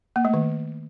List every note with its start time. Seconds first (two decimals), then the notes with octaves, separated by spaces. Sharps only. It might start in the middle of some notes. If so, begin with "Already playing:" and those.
0.16 A#3
0.25 A3
0.34 D#3